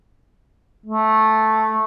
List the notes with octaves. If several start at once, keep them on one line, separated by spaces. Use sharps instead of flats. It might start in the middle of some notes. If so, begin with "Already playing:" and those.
A3